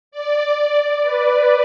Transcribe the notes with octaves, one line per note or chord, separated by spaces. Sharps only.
D5
B4